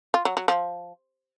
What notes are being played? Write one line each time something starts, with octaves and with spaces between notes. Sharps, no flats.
F4
F#3
F#3
F3